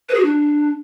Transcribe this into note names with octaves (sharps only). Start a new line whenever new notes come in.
B4
G#4
F#4
D4